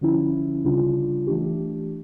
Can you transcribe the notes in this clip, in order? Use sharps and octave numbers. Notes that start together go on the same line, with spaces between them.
D3 F3 C#4 E4
C#2 C#3 G3 D4 F4
E3 A3 D4 G4